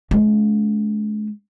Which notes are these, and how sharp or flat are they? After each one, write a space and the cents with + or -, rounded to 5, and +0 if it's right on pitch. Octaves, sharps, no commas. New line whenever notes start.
G#3 +40 C#4 +40